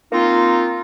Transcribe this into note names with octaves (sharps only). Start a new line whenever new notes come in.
A#3 C4 D#4 F4